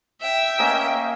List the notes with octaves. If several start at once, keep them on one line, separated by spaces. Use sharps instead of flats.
E5 G5
A#3 C#4 D#5